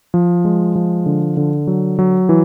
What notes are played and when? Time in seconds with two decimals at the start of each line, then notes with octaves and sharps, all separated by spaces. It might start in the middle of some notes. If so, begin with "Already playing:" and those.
0.14 F3
0.45 G#3
0.75 F3
1.06 D3
1.37 D3
1.67 F#3
1.99 F#3
2.29 E3